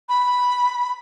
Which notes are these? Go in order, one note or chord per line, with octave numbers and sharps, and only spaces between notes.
B5